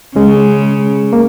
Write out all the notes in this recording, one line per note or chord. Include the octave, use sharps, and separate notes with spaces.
C#3 G#3 C#4
A#3